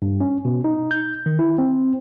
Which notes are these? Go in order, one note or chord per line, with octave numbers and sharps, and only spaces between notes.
G2
C#4
B2
D#4
G6
D#3
E4
C4